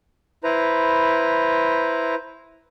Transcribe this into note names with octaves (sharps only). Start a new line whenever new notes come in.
E4 B4 C5 A#5